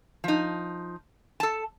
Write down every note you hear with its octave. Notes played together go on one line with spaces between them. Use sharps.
F3 D#4
A4 A5